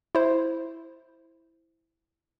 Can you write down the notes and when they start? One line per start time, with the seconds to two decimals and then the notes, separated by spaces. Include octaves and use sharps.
0.15 E4 C5